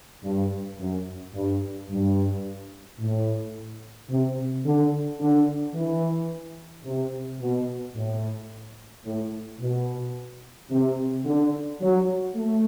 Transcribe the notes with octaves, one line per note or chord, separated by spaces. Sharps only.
G2
F#2
G2
G2
A2
C3
D3
D3
E3
C3
B2
A2
A2
B2
C3
D3
F#3
A3